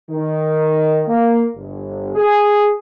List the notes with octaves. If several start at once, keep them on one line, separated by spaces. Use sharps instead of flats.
D#3
A#3
G1
G#4